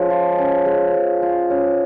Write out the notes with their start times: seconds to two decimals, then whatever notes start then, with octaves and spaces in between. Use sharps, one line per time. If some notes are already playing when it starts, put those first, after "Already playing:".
Already playing: F3 G#3 C#4
0.10 F4
0.38 C#4
0.66 G#3
0.94 F3
1.22 F4
1.50 C#4